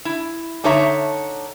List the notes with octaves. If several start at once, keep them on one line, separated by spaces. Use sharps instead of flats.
E4
D3 D#4 A4 C#5 E5 A#5